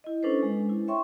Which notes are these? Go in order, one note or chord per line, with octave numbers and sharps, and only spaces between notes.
E4 D#5
C#4 D4 A4 B4 C5
G#3
E4
C#5 E5 G5 C6 C#6